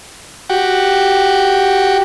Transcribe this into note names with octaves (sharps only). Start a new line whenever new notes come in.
F#4 G4